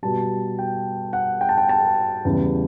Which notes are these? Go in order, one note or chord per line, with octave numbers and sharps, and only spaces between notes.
B2 G3 A5
G5
F#5
G5
A5
G5
A5
E2 C#3 E3 G3